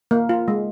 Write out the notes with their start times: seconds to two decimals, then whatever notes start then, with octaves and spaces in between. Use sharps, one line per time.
0.11 A#3
0.29 F4
0.48 G#3